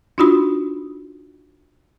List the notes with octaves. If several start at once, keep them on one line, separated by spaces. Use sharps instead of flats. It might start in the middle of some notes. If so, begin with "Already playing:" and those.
D4 D#4 F4 F#4 B5 D#6